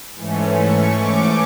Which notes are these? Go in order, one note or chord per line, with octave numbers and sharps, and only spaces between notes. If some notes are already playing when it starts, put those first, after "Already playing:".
G#2 E3 A3 C#4
C#6
D6